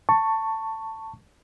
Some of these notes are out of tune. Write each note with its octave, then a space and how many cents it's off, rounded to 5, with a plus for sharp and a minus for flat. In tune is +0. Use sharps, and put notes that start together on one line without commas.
A5 +15 C#6 +0